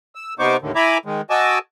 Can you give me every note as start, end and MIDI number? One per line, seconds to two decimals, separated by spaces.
0.15 0.34 88
0.39 0.57 48
0.39 0.57 59
0.39 0.57 63
0.39 0.57 72
0.39 0.57 85
0.39 0.57 86
0.62 0.72 39
0.62 0.72 45
0.62 0.72 50
0.62 0.72 51
0.75 0.98 64
0.75 0.98 76
0.75 0.98 80
0.75 0.98 82
0.75 0.98 83
0.75 0.98 86
1.05 1.21 51
1.05 1.21 56
1.30 1.59 66
1.30 1.59 75
1.30 1.59 80
1.30 1.59 81
1.30 1.59 86
1.30 1.59 88